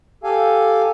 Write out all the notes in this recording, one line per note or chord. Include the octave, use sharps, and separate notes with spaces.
G4 A4 F5 G#5